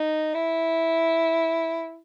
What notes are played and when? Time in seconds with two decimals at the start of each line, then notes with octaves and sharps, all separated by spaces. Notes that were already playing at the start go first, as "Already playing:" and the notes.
Already playing: D#4
0.34 E4